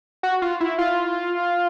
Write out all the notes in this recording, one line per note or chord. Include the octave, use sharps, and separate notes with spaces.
F#4
F4
E4
F4